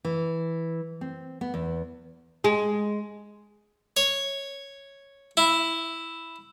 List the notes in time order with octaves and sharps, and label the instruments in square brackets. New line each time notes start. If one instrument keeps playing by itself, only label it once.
[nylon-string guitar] E3
C4
B3
E2
[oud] G#3
[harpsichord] C#5
E4